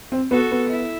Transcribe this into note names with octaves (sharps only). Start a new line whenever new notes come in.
C4
B3 F#4 A4
B3
E4